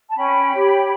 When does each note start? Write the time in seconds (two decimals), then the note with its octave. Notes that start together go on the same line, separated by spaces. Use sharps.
0.09 A5
0.16 C#4 G5 B5
0.53 G4 C#5